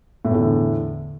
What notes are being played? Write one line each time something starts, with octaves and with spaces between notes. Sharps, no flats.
E2 A2 D3